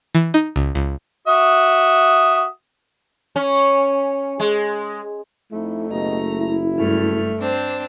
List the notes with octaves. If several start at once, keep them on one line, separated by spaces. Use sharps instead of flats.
E3
D#4
C#2
C#2
F#4 E5 D#6
C#4
G#3
F2 A3 D#4 E4
F#1 B2 G4 D#5 A#5
E4
G2 A3 F6
C4 D4 C5